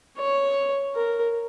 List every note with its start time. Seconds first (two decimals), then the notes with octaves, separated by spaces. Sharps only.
0.18 C#5
0.95 A#4